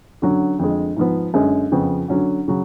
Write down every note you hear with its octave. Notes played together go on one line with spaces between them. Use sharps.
D3 F#3 C#4 F#4
F2 D3 G#3
G#2 F3 B3
F#2 D3 G#3 C#4
F2 C#3 F3 B3
D3 F#3 C#4 F#4
C#3 F#3